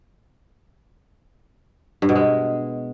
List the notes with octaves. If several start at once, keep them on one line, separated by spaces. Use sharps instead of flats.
G2
B2
G#3